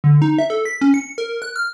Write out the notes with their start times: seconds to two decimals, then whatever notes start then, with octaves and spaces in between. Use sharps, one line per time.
0.04 D3
0.22 D#4
0.39 E5
0.50 A4
0.65 B6
0.81 C#4
0.94 C#7
1.18 A#4
1.42 F#6
1.56 F6